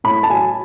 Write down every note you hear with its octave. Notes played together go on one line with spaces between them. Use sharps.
A2 B5
A5
F#3 G#5